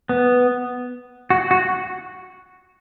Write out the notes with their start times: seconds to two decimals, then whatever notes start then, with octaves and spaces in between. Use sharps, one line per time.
0.09 B3
1.30 F#4
1.51 F#4